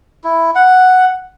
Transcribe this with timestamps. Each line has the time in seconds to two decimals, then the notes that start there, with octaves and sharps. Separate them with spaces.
0.24 E4
0.55 F#5